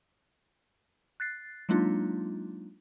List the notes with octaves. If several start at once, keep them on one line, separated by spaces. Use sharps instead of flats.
F#6 A6 C7
F#3 G#3 A#3 D4 D#4 F4